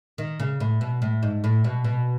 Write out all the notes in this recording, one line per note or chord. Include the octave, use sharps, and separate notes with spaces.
D#3
C#3
A2
B2
A2
G#2
A2
B2
B2